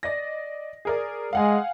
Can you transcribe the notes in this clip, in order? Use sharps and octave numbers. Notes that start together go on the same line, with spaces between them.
D5 D#5 A#6
G#4 A#4 D5
G#3 F5 F#5 G#5